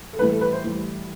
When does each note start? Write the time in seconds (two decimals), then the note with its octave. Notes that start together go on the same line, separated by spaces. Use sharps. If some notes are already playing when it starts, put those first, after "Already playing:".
0.13 A4
0.18 A2 E3 G3 B4
0.30 A4
0.41 B4
0.53 C5
0.64 A2 E3 G3